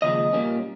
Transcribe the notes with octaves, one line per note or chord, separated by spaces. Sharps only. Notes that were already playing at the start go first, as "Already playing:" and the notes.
D#2 C#3 F3 G#3 D#5
A#2 G3 A#3 C#4